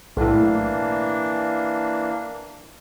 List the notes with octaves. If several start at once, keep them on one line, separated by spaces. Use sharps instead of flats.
B1 A2 E3 A#3 D4